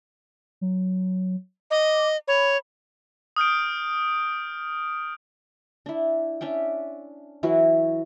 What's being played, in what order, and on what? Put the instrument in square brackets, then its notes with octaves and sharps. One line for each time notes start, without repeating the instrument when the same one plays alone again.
[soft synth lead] F#3
[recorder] D#5 [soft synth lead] D6
[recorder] C#5 [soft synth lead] B5
[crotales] D#6 F6 G6 D7
[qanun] D4 E4
C#4 D4 E5 G5
E3 F#3 E4 F#4